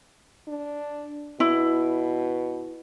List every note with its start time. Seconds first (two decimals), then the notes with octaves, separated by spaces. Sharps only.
0.48 D4
1.40 B2 E4